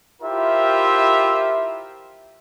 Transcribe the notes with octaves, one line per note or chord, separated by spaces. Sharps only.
E4 F4 G4 A#4 C5 E5